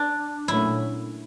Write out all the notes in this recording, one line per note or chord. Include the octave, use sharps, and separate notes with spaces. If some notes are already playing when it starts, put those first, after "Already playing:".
Already playing: D4
A#2 F#3 A3 C#4 E4